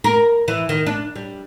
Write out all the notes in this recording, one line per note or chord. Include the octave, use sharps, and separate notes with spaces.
A#4
E3
D#3
D4
G3